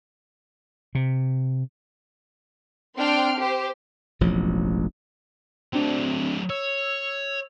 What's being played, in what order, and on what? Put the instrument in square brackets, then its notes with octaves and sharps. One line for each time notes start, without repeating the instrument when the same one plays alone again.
[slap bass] C3
[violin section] C4 D4 G5 C6 F6 D7
G4 C5
[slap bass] E1 A1 F3 F#3
[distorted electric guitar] F#3 A3 [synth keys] C4 D4
[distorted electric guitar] C#5 [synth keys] E6